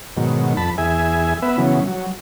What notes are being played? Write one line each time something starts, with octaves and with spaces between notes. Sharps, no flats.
G#2 B2 D#3 F#3
F2 A5 B5
E2 G#4 E5 G#5
B3 B4 E5
C#3 E3 F#3 B3
F#3